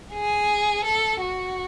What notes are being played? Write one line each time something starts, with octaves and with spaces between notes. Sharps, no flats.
G#4
A4
F#4